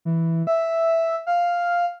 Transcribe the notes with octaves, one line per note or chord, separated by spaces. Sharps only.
E3
E5
F5